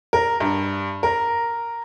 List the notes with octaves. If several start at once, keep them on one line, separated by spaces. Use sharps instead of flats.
A#4
G2
A#4